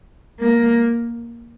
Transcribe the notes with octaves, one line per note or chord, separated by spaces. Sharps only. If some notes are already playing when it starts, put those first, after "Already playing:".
A#3